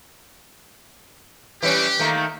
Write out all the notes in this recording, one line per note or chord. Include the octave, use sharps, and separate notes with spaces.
E3 G3 C#4 G4
D#3 A3 A#3